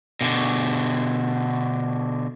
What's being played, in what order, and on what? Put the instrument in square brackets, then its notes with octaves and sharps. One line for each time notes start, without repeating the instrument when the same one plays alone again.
[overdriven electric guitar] B2 D3